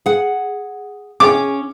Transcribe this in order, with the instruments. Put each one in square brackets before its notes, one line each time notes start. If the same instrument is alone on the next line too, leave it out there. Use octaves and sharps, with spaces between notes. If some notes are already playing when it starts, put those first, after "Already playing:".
[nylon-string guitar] G#4 F#5
[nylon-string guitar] C#4 G#4 C#5 [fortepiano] D6